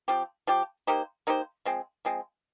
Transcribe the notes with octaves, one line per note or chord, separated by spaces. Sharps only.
F3 C4 G4
F3 C4 G4
A#3 D#4 G4 C5
A#3 D#4 G4 C5
F3 G#3 C4
F3 G#3 C4